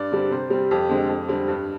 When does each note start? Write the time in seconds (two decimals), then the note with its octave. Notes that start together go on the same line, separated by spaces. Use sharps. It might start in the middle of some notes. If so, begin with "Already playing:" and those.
Already playing: G2 D5
0.12 D3 G3 C4
0.31 C3 C5
0.50 G3 C4
0.71 F2 G4
0.89 D3 G#3 C4
1.09 F2
1.28 D3 G3 C4
1.48 G2